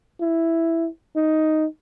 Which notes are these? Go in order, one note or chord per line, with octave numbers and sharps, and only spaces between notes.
E4
D#4